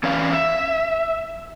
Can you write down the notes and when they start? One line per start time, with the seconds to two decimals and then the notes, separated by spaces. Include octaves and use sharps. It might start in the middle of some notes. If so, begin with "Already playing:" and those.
0.03 E3 C#4 B4 D5 F5
0.32 E5